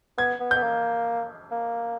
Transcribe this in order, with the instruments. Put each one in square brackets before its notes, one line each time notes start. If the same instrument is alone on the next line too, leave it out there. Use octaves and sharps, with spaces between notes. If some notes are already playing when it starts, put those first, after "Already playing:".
[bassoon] B3 [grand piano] G#6
[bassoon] B3
[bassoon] B3 [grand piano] G6
[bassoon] A#3
A#3